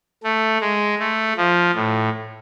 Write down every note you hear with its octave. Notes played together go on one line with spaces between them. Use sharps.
A3
G#3
A3
F3
A2